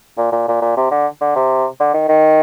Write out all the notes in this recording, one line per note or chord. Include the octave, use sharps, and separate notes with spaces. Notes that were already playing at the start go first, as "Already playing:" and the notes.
A#2
A#2
A#2
A#2
C3
D3
D3
C3
D3
D#3
D#3